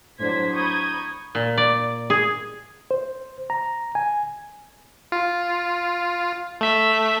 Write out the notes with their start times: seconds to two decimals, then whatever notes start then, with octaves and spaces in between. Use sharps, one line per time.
0.19 A2 F#3 D4 C5 G#6 B6
0.55 A#5 B5 C#6 D#6 G6 G#6
1.35 A#2
1.57 D5
2.10 G#4
2.91 C5
3.50 A#5
3.95 G#5
5.12 F4
6.61 A3 E5 B6